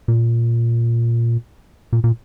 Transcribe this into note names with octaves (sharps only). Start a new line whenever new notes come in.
A#2
A#2
A#2